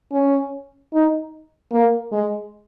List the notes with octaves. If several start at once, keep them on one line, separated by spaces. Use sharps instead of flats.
C#4
D#4
A#3
G#3